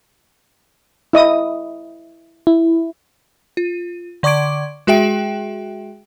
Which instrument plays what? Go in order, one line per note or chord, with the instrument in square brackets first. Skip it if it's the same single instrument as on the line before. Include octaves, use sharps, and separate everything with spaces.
[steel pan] E4 D#5 D#6
[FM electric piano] E4
[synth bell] F4
D3 D5 C#6 D6 G#6 D7
G#3 F#4 G#4 E5 G5 D7